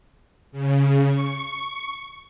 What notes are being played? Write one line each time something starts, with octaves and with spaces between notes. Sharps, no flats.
C#3
C#6